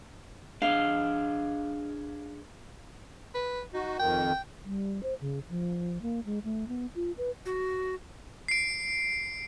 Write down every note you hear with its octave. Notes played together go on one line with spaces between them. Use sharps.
D4 G#4 D#5 F5
B4
D#4 F#4
F2 D#3 G5
G3
C5
C#3
F3
A#3
G#3
A3
B3
F4
B4
F#4
C7 D7